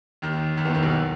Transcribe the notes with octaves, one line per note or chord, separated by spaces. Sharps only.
D#2 D#3
D#2 D#3
E2 E3
D#2 D#3
B1 B2